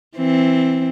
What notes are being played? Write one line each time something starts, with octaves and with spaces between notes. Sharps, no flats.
E3 C4